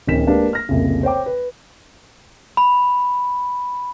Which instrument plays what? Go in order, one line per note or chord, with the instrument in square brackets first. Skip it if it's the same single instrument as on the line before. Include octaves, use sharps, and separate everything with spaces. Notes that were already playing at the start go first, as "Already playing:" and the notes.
[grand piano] D1 D#3 C#4 B6 E7
G#3 A#3 D4 G4 B4 F5
F6 A#6
F1 C2 A#2 C#3
C5 C#5 G5 D6
B4
[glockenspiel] B5